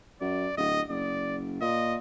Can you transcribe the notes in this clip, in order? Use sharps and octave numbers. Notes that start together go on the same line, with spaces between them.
F#2 D5
D1 D#5
F#1 D5
A#2 D#5